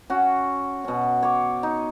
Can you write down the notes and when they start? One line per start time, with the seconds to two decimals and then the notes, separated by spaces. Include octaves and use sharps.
0.10 C#4 F#4
0.84 B2 C#4
1.23 C#5 D6
1.63 D#4